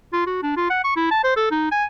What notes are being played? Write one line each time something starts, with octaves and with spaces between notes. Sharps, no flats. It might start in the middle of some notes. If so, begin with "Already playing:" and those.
F4
F#4
D4
F4
F#5
C#6
E4
A5
C5
A4
D#4
G#5